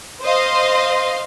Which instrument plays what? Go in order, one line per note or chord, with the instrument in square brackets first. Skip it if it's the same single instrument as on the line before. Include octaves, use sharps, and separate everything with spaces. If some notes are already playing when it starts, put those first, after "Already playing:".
[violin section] C5 D#5 F5 C6